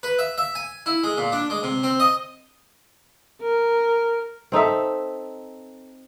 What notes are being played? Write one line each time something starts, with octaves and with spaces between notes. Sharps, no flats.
B4
E5
E5
G#5
E4
G#3
A#2
D4
G#3
C3
C4
D#5
A#4
C4 D#4 A4 E5